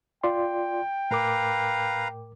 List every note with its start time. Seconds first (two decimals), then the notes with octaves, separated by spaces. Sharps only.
0.23 F4 D5 G5 C6
1.11 A2 A#4 B4 F5 A#5 D6